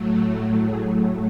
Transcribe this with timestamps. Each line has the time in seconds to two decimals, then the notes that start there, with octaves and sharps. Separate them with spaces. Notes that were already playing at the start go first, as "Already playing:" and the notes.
Already playing: A2 F#3 A3
0.64 G#4